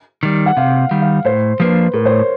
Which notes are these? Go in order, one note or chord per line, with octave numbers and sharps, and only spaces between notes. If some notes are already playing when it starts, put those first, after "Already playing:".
D#3 G3
F#5
C3 F5
D#3 G3
F5
A2 C5
F3 A#3 D4 B4
A2 A#4
C5
C#5